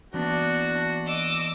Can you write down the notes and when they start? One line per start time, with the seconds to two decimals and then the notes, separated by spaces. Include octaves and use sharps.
0.14 E3 A#3 B3 D4 F#4
1.06 D#5 D6 E6